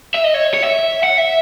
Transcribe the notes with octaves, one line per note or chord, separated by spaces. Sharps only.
E5
D#5
C#5
C#5
E5
F#5
E5